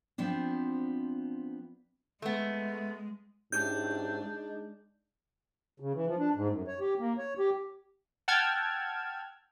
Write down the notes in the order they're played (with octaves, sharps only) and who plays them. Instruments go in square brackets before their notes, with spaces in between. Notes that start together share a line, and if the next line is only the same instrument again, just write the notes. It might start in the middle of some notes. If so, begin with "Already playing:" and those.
[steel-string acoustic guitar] F3 B3 C4 D4
[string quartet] G#3 [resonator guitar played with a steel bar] A3 B3
[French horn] G#2 [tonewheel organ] C#4 E4 G4 [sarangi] D4 [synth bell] G6
[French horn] G#3 [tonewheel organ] D#4
[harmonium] C#3
E3
F3
D4
G#2
F#2
C#5
G4
A#3
C#5
G4
[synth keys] F#5 G5 A5 E6 F6 G#6